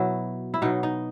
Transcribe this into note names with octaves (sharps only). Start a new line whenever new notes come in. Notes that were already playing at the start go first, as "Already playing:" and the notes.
Already playing: B2 F#3 E4
E4
B2 F#3 D#4
D#4